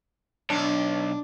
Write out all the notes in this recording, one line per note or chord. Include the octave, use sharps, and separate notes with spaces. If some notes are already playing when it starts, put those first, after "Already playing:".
B1 D4